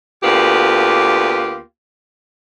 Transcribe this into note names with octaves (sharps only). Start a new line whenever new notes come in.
D2 A#3 B3 F4 G4